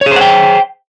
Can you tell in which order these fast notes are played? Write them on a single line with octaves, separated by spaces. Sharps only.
C#5 G#4 C5 F#5 G5